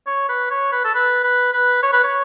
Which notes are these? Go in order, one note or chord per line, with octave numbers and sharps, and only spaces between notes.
C#5
B4
C#5
B4
A4
B4
B4
B4
C#5
B4
C#5